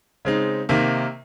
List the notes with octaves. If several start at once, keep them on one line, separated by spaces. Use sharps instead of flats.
C#3 G#3 C4 D#4
C3 D#3 A#3